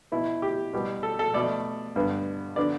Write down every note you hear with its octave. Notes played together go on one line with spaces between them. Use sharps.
B2 B3 E4
G4
B2 G3 B3
A4
A4
B2 A3 D5
G2 D3 B3
D3 B3 D5